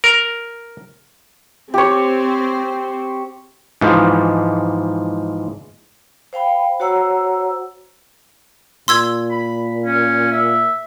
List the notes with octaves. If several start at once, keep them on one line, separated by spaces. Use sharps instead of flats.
A#4
C4 G4 C5 C#5
G#2 E3 F3
C5 F5 G5 B5
F#4 C5 C#5 F#5 A#5 E6
A#2 C6 E6 G#6
B5
C#4
E5